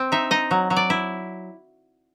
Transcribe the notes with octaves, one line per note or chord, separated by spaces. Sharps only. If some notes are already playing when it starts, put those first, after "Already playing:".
Already playing: C4
D#4 E5
D#4 D#5
F#3
F#3
D5
E4